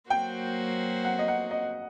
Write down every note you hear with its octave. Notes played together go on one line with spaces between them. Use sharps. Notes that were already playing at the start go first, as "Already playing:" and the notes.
F#3 A#3 F#4 C5 G5
F#5
D#5
F#5
D#5